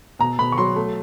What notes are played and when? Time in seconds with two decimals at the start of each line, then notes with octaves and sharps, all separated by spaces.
0.19 B2 A#5
0.39 B2 B5
0.52 C#6
0.58 F#3 C6
0.76 A3